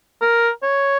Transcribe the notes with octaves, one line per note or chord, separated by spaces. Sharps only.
A#4
C#5